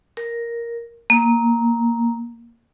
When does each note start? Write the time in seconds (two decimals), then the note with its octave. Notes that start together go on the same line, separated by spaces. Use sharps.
0.17 A#4
1.10 A#3